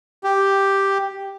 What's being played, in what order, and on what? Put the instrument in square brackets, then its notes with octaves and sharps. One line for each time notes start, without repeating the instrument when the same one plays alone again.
[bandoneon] G4